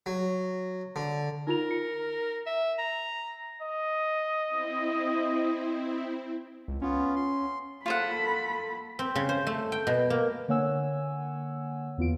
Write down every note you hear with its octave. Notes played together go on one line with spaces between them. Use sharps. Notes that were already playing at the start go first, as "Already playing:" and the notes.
F#3
D3
D#4 F4 A#4 F7
C#7
E5
A#5
D#5
C4 E4
C#2
B3 C#4 F4
C6
A#3 F4 A4 C5 F#5 B5
C4
C#3
C5
A3
G5
B2
A#3
D3 A#3 C#5 F#5 G#5 E6
E2 B3 F4 D7